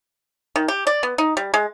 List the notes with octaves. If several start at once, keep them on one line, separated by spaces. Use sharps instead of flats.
D#3
G4
D5
B3
D#4
G3
G#3